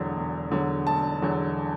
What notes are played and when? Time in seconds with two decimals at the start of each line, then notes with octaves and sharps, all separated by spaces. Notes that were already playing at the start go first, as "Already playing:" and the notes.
Already playing: E1 E2 D3 F#3
0.16 E1
0.51 E2 D3 F#3
0.86 E1 A5
1.22 E2 D3 F#3